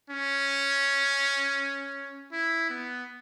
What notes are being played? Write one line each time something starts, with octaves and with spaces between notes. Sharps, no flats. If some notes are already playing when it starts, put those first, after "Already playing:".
C#4
E4
B3